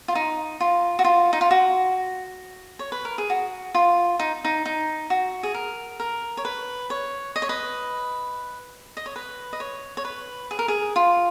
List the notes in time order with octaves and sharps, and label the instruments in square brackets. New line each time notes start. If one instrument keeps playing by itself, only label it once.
[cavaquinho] F4
D#4
F4
F#4
F4
D#4
F4
F#4
C#5
B4
A#4
G#4
F#4
F4
D#4
D#4
D#4
F#4
G#4
A#4
A#4
C#5
B4
C#5
D#5
C#5
B4 D#5
D#5
C#5
B4
D#5
C#5
C#5
B4
G#4
A#4
G#4
F4